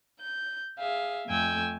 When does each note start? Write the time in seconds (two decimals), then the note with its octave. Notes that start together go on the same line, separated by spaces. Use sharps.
0.20 G6
0.78 G#4 E5 F5
1.26 F2 A3 G5 G#5 E6 G6